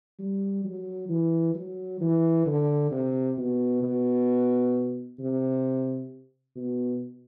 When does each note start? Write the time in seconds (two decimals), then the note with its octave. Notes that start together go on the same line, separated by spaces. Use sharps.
0.19 G3
0.64 F#3
1.09 E3
1.55 F#3
2.00 E3
2.46 D3
2.91 C3
3.38 B2
3.82 B2
5.19 C3
6.56 B2